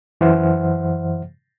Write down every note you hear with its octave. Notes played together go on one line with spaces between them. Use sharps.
F#2 E3 C5 E5 F#5 F6